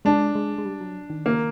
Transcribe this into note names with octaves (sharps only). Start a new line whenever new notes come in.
G#3 D4
G#3
G#3
G3
F#3
D#3
A#3